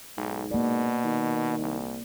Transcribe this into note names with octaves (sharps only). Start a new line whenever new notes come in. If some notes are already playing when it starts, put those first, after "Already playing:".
B1 G#2
B2 A#3 D5
D#3
C2